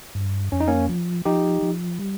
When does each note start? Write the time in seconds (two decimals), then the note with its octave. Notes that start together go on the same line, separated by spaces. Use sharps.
0.15 G2
0.52 F2 C#4
0.60 D#4
0.68 A#3 C#4
0.89 F3
1.25 F3 D#4 G4
1.63 F3
1.99 G3